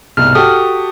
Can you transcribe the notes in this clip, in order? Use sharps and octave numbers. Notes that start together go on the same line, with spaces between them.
C2 G#2 B2 F6
F#4 G4 A4 D#6